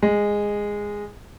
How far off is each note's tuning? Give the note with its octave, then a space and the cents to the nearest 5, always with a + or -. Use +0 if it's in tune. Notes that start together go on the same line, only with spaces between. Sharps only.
G#3 -10